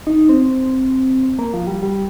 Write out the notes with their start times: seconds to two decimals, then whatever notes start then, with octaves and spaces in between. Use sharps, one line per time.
0.07 D#4
0.29 C4
1.39 A#3
1.53 F3
1.67 G3
1.83 G3